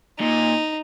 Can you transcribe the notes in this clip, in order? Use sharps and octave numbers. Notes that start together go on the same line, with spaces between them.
A#2 D#4